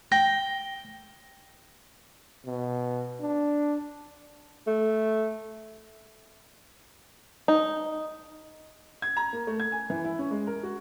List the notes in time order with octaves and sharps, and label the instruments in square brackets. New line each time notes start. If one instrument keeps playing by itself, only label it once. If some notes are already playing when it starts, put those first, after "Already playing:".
[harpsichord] G5 [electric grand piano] A#6
[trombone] B2
D4
[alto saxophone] A3
[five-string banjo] D#4
[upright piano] G#6
A#5
A#3
A3
G#6
G#5
E3
E4
C#4
G#3
A#4
F#4